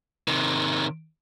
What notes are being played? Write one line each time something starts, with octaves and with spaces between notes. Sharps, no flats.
C3 D#3